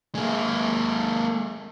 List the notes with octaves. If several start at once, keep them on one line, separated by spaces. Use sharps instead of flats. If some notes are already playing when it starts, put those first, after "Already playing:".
G#3 A#3